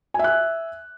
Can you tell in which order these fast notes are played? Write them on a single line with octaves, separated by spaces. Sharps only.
G#5 E5 F#6